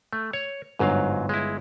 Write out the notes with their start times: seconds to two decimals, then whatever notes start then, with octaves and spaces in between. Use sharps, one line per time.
0.13 A3
0.33 C#5
0.79 G1 G#2 F#3 B4 C#5 F5
1.29 G#3 E4